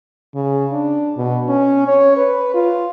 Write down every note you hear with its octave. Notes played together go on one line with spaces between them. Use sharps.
C#3
D4
B2
C#4
C#5
B4
F4